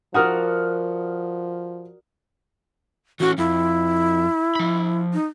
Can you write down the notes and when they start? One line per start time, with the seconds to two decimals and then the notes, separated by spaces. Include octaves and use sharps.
0.14 F3 F#4 A#4 D5 F#5 D#6 F6
3.20 E3 C#4 F#4
3.38 F2 E4
4.55 F3 B5
5.13 D#4